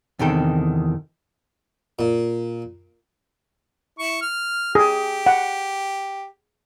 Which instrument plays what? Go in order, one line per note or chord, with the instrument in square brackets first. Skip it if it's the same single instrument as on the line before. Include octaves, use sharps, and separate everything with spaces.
[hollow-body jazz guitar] E2 C3 D#3 A4 G5
[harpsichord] A#2
[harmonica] E4 C#6
F6
[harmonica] G4 [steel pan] G#4
[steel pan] F#5